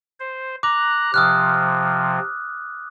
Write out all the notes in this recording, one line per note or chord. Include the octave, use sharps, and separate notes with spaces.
C5
A#5 D6 F#6
C3 F3 D#6 F6 F#6